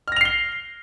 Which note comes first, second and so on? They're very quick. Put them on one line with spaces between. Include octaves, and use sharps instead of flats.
F6 A#6 F7 C7 G7